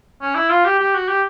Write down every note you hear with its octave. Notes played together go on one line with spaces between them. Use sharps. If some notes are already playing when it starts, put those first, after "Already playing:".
C#4
E4
F4
G4
G4
F#4
G4